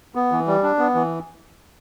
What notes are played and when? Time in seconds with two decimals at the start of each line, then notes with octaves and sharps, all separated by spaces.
0.15 B3
0.32 E3
0.47 G3
0.63 D4
0.79 B3
0.95 E3